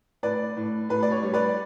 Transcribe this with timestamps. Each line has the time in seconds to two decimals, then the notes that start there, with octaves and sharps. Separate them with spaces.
0.23 A2 B4 D5
0.57 A2
0.89 A2 B4
1.03 D5
1.11 C#5
1.23 G3
1.33 B4 D5